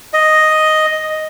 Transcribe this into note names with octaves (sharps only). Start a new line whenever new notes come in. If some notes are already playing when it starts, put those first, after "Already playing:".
D#5